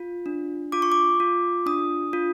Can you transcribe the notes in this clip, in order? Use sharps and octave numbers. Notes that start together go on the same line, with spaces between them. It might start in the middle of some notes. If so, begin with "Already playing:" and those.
Already playing: F4
D4
F4 D6
C#6
D6
F4
D4 D#6
F4